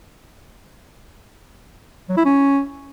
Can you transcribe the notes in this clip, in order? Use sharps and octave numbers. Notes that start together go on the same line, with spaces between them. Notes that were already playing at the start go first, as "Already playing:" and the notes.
F#3
E4
C#4